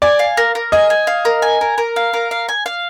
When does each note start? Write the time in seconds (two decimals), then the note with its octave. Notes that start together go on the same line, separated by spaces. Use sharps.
0.02 D5 G#5
0.19 F5
0.37 A#4
0.55 A#4
0.72 D#5 G#5
0.90 G#5
1.07 F5
1.25 A#4
1.42 G#5
1.61 A#4
1.78 A#4
1.96 F5
2.13 A#4
2.31 F5
2.48 G#5
2.66 F5